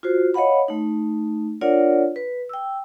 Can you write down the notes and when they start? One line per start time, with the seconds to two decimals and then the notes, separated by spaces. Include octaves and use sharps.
0.03 F4 F#4 C5
0.34 C#5 D#5 F5 F#5 B5
0.68 A3 D#4
1.61 D4 F4 A#4 C#5 D5 F#5
2.16 B4
2.49 G5 E6